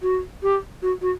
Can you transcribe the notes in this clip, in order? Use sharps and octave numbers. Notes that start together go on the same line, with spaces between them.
F#4
G4
F#4
F#4